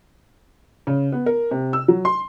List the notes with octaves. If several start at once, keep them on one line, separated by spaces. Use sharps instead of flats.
C#3
B3
A#4
C3
E6
F#3
C6